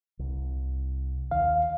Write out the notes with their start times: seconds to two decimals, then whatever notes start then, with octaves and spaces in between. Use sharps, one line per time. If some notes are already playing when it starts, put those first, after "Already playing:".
0.19 C2
1.31 D#2 F5